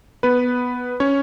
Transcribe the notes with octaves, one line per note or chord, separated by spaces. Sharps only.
B3 B4
C#4 C#5